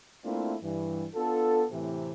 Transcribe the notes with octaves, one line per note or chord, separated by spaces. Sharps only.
A3 A#3 C4 D4 E4 F4
G2 E3
B3 D4 F4 A4
A2 C3 E3